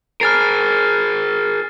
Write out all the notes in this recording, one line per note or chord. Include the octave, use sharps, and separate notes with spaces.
G#4 A#4 F6 A6 C7